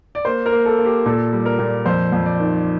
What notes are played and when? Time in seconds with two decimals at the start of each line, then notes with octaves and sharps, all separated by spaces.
0.15 D5
0.25 A#3 C5
0.46 A#4
0.52 A#3
0.65 A4
0.79 A#3
0.85 G4
1.06 A#2 A4
1.32 G3
1.46 A#4
1.59 A#2
1.86 F2 C5
2.12 F2
2.26 D5
2.40 D#3